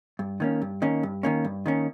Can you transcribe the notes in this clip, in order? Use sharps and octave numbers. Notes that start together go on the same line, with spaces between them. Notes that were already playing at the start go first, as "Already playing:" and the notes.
G2
D#3 A#3 C#4
G2
D#3 A#3 C#4
G2
D#3 A#3 C#4
G2
D#3 A#3 C#4